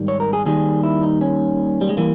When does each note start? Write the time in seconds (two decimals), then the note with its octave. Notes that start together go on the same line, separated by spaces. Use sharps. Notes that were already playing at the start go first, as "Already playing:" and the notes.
Already playing: G#2 D#3 G3
0.08 C#5
0.20 A#4
0.33 G#4
0.45 D#2 D#3 G3 G#4
0.83 E4
1.03 D#4
1.21 C#4
1.81 G3
1.89 G#3
1.97 E3 G3 A#3